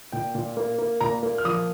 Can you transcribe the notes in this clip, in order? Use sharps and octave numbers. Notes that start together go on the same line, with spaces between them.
A#2 G5
A#2
A#3
A#3
A#2 A#5
A#3
F6
F3 D#6